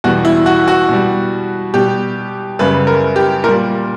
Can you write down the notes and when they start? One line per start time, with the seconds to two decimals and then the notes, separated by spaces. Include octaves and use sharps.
0.04 E2 B2 G3 F#4
0.25 E4
0.46 F#4
0.68 F#4
0.89 B2 G3
1.74 B2 G3 G4
2.59 F#2 C#3 G3 B4
2.87 A#4
3.16 G4
3.44 A#2 A#4
3.48 G3